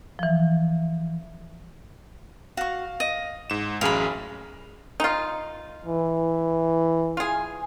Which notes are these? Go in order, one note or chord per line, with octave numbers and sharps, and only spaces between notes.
E3 F3
F#4 F5 C#6
D#5
G#2 E7
A1 F#2 G#4 F5 B5
D#4 F4
E3
F4 G#4